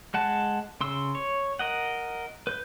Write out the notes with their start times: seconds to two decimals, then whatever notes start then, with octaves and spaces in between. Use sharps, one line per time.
0.14 G#3 F#5 A5
0.81 C#3 C6 E6
1.15 C#5
1.59 A#4 D#5 F#5
2.47 B4 G6